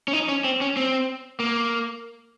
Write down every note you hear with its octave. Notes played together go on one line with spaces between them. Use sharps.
C#4
D#4
C#4
C4
C#4
C4
A#3